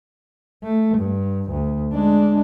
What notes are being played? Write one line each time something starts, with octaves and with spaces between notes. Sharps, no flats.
A3
G2
D2
G#3 D4